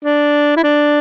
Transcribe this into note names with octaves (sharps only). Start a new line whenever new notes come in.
D4
E4
D4